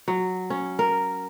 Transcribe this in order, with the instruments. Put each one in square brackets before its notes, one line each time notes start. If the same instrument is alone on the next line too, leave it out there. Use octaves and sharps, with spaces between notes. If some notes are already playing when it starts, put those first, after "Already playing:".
[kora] F#3
C#4
A#4